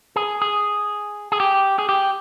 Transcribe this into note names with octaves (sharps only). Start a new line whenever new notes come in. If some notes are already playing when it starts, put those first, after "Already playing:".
G#4
G#4
G#4
G4
G#4
G4